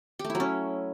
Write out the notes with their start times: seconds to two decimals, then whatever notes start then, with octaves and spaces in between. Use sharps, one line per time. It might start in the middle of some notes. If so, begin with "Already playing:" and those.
0.19 G4
0.24 A3
0.30 E4
0.35 F#3
0.40 C#4